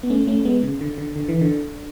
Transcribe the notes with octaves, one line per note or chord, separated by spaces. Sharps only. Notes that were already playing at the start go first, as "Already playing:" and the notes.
B3
A3 C#4
A3 C#4
G#3 B3
C#3
D3
D3
D3
E3
D3